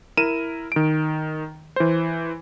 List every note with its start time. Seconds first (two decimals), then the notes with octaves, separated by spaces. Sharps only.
0.17 E4 A#4 D#7 E7
0.72 D#3 D7
1.76 E3 C5